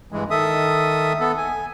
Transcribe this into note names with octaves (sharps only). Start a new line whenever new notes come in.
G2 E3 G#3
D#3 A4 E5 D#6
B3 A4
G#5